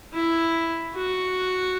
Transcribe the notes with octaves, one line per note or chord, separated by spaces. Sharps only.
E4
F#4